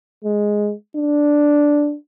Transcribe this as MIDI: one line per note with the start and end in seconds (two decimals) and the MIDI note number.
0.24 0.73 56
0.97 1.95 62